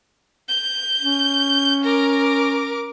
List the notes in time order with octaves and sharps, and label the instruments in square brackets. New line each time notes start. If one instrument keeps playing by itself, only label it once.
[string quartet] G6
[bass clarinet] C#4
[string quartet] A#4 D6